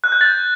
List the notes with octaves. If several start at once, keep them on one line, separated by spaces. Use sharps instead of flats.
F#6
G6
A6